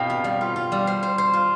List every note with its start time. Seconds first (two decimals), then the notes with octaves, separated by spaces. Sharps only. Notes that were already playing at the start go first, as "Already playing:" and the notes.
Already playing: B2 F5 G5
0.10 B3
0.24 G3
0.41 F4
0.56 F4
0.72 G3
0.87 C5
1.03 C5
1.18 C5
1.33 F4